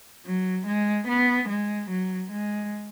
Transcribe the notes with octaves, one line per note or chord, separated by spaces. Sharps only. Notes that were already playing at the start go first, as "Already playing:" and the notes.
F#3
G#3
B3
G#3
F#3
G#3